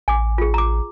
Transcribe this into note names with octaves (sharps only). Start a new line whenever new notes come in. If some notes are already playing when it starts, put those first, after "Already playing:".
A1 G#5 D6
F4 G#4
A#5 D6